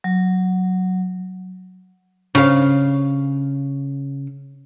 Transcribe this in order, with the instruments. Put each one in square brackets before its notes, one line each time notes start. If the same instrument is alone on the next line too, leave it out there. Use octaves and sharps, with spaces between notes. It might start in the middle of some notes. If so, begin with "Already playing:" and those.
[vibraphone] F#3
[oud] C#3 F5